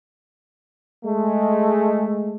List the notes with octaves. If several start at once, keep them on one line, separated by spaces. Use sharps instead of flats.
G#3 A3